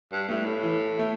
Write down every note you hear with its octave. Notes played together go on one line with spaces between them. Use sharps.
G2
G2 A3 E4
A2
E3
A3 E4